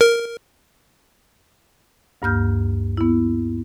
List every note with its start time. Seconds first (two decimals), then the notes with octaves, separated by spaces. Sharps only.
0.01 A#4
2.22 D2 G2 A#3 F6 G6
2.97 B3 E4